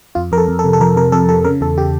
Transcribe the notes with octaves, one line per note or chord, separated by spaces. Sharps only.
F2 F4
F2 A#4
A4
F2
A4
C3
A4
F2 A#4
C3 A#4
F2 A4
C3 A4
C#3 A#4
E2 A4
C#3 G4